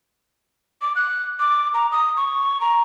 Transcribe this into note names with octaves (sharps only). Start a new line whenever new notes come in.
D6
F#6
D6
A#5
D#6
C#6
A#5